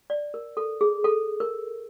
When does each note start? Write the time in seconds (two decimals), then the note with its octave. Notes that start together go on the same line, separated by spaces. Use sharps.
0.10 D5
0.34 A#4
0.57 A4
0.81 G#4
1.04 A4
1.40 A#4